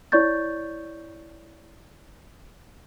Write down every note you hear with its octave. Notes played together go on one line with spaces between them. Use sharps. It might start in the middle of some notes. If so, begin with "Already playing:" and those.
E4 C#5 D5 C#6 G6 A6